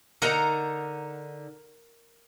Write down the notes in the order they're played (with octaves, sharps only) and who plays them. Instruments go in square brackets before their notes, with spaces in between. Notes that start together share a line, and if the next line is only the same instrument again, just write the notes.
[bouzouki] D3 D#4 A#5 [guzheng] A#4 F#5